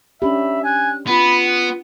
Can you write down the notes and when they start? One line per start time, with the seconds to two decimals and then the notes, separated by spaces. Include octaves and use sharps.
0.22 C#4 D4 G4 E5 B5
0.64 G#5 F#6
1.07 B3 F4 B5
1.46 F#5